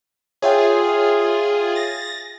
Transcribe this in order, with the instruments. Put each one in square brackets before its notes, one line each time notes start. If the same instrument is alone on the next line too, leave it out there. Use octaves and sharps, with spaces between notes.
[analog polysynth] F4 G#4 [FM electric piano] C#5 E5 G5
[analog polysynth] A6 A#6